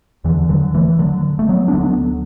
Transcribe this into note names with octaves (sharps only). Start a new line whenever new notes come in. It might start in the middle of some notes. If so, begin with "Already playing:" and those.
E2 D3 E3
D3 F#3
E3 A3
D3 F#3
A3
F#3 B3
D4
D2 D3 F#3 B3